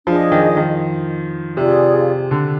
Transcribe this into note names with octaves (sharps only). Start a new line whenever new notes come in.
F3 D4 G#4 D#5
D#3
D#3
C3 F4 G#4 D5
D3